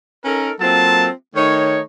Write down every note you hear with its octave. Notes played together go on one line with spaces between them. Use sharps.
C#4 D#4 A4 A#4
F#3 A#3 C4 F4 A4 A5
D#3 A3 D#4 C#5